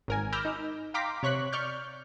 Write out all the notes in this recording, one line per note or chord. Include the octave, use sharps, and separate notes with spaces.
G#1 A#4 G#5
B5 D6 E6 F6 G6 A#6
D#4
F5 G5 A#5 C6 D6 B6
C3 C#5 C#6 F#6 B6
D5 C#6 F6 G6